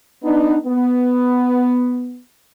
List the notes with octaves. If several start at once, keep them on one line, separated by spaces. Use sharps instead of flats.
B3 D4 D#4
B3